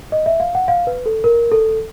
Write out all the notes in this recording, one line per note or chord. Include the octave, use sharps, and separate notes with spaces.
D#5
E5
F5
F#5
F5
B4
A4
A#4
A4